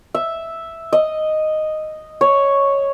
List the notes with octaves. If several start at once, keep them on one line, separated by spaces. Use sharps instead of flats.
E5
D#5
C#5